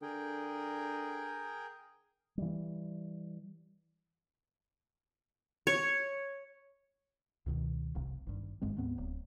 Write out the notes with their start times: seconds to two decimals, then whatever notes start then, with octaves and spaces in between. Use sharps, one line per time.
0.02 D3 G#4 A#4 G5
2.38 E3 G3
5.67 C#5
7.46 C#2 B2 D#3
7.95 F1 C2
8.27 G#1 G2
8.61 G#1 G2 G#3 C4
8.77 D2 G#2 B3 C4
8.98 D1